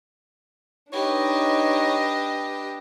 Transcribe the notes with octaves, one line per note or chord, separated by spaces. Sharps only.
D4 D#4 G4 B4 C#5 D#5